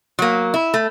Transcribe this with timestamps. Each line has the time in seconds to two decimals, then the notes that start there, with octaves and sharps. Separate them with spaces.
0.19 F#3 A#3
0.54 E4
0.74 A3